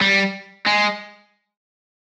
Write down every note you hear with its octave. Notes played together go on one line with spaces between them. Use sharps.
G3
G#3